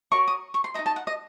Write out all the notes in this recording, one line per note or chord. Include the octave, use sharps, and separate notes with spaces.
F#4 A#4 C#5 C#6
D#6
C#6
C6
D#4 A4 D#5 A#5
A5
F#5
D#5